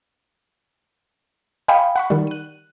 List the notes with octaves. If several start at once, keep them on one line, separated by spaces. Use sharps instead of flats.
D#5 F5 G5 G#5 B5 C#6
F#5 B5 C#6
D#3 G3
F#6 D#7